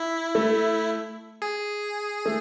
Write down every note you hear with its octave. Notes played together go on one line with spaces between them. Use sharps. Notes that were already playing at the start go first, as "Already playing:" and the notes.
Already playing: E4
A3
G#4
A3